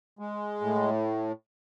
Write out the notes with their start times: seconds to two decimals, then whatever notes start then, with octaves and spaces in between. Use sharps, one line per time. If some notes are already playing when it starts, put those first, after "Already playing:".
0.19 G#3
0.61 A2